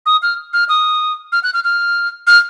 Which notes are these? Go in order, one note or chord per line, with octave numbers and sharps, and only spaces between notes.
D#6
F6
F6
D#6
F6
F#6
F6
F6
F6